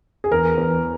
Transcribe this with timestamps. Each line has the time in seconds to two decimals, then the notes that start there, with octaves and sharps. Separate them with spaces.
0.24 G#4
0.31 E2 A#4
0.57 E2